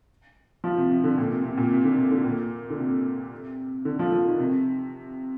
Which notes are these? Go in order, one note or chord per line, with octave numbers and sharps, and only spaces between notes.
F3
C3
C3
D3
A#2
C3
C3
A#2
C3
D3
C3
D3
A#2
D3
C3
D3
F3
F3
D#3
C3